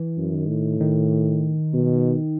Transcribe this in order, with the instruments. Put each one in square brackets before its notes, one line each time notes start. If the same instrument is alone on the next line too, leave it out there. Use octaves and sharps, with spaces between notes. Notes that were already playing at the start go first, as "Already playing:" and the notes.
Already playing: [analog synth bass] E3
[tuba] F#2
[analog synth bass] D#3
[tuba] A2
[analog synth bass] D#3
[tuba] B2